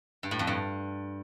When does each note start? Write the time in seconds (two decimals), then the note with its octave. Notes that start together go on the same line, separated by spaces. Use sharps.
0.23 G2
0.31 A2
0.39 F2
0.47 G2